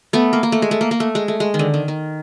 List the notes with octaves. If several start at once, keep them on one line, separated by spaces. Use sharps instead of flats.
A3 B3
A#3
A#3
A3
G#3
A3
A#3
A#3
A3
G#3
A3
G#3
D#3
D3
D#3
D#3